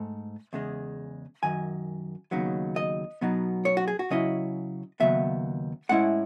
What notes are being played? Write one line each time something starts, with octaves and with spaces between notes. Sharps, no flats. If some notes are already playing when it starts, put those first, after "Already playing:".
Already playing: G#2 A3
E2 C#3 G#3
F#2 D#3 G#5
D#2 C#3 F#3 B3 D#4
D#5
B2 F#3 B3 D#4
C#5
F#4
G#4
F#4
C#3 F#3 C#4 E4 D#5
D#2 C#3 F#3 B3 E5
A2 G#3 C#4 E4 F#5